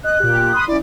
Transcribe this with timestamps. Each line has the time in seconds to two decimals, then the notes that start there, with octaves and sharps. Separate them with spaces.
0.04 D#5 F#6
0.20 A#2 G4
0.52 B5 C6 D#6
0.68 C#4 E4 D5